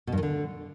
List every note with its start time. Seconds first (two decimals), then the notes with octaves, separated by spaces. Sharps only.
0.07 B2
0.12 G2
0.17 D#3
0.23 D3